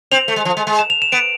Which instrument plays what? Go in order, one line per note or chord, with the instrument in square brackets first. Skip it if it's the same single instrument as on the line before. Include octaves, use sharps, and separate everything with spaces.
[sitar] C4 [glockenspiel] F7
[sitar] A3
G#3
F3
G#3
G#3
[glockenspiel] E7
F7
E7
[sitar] B3 [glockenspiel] D7